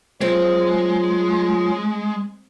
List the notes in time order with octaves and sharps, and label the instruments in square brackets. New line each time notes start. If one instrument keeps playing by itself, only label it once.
[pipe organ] F#3 F4 [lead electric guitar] G#3 [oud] C4